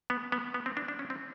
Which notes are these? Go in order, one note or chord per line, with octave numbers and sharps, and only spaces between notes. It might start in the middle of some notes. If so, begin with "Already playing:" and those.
B3
B3
B3
C4
D4
D4
C#4
C4